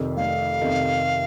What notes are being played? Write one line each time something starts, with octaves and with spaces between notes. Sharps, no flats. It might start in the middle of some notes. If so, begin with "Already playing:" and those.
Already playing: F1 F2 C3 D#3
F1 F5
F2 C3 D#3